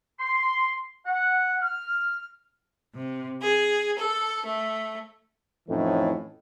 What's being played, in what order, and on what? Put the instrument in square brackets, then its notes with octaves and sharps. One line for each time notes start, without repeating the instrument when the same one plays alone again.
[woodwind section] C6
F#5
F6
[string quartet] C3
G#4
A4
A3
[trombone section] F2 A2 E3 C#4 D#4